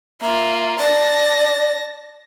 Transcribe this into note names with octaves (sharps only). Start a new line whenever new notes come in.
A#3 F4 E5
D5 A5 A#6